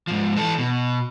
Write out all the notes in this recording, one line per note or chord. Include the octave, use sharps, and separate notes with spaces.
G#2 F3
E3 A4
B2